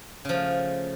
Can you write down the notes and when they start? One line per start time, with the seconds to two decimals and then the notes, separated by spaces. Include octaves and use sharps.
0.25 C#3
0.29 F3
0.33 A3